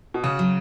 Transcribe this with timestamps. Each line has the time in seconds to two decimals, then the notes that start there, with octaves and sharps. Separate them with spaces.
0.14 B2
0.23 C#3 F#4
0.39 F#3